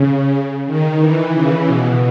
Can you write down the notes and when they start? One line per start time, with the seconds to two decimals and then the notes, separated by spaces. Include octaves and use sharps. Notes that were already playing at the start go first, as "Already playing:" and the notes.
Already playing: C#3
0.67 D#3
1.00 E3
1.33 C#3
1.67 B2